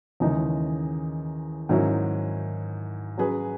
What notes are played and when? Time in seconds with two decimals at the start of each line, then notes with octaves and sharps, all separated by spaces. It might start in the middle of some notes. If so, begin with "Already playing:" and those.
0.20 D#2 C#3 E3 G#3 D#4
1.69 G#2 D#3 F#3 C#4 E4
3.17 F#3 C#4 G#4 B4